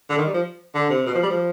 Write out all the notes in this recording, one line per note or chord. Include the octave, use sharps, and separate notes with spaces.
D3
D#3
G3
F3
D3
C3
B2
F3
G3
F3